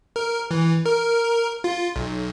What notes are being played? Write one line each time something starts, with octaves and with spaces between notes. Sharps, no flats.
A#4
E3
A#4
F4
B1